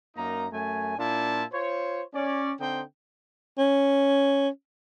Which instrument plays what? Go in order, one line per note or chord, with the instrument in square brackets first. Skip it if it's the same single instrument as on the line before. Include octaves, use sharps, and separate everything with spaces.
[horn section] F#2 A#3 D#4 A#5
F#2 A3 G#5
A#2 D4 E4 F4 A5
F4 C5 C#5
C#4 D5
D3 C4 D#4 C5 G5
[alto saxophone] C#4